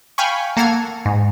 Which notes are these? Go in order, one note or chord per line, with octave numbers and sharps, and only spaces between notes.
F5 G5 G#5 B5 C#6
A#3 A4 F#5 F6 G#6
G#2